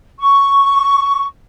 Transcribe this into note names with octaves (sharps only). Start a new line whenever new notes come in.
C#6